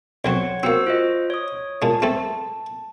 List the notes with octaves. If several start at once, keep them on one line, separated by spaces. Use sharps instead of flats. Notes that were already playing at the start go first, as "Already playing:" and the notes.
B1 F#3 C4 C#5 F#5 C#6
A#3 C4 F#4 C5 E6
F4 C5 D#5
C#5 D#6
A#2 G#3 A5
A3 C4 A4